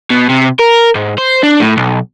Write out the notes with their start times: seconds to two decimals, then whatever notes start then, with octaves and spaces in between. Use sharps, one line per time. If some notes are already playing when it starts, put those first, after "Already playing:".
0.10 B2
0.29 C3
0.59 A#4
0.95 G#2
1.18 C5
1.43 D4
1.60 A2
1.77 B1